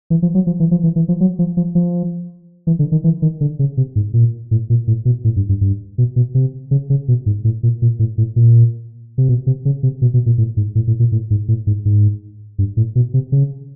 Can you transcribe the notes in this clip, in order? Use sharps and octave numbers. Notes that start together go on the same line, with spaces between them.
E3
F3
F#3
F3
E3
F3
E3
E3
F3
F#3
F3
F3
F3
E3
D3
D#3
E3
D#3
D3
C#3
C3
G#2
A#2
A2
A#2
A2
B2
A2
G2
G2
G2
B2
B2
C3
C#3
C#3
B2
G#2
A2
A#2
A#2
A2
A2
A#2
C3
B2
C3
C#3
C3
B2
B2
A#2
A2
G#2
A2
A2
A#2
A2
G#2
A2
G#2
G#2
G2
A2
B2
C3
C#3